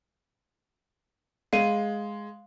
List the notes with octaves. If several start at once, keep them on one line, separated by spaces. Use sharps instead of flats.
G#3 F5 D#7